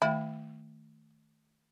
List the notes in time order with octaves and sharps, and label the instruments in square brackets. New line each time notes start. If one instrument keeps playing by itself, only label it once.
[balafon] D#3 A3 G5 [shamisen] E4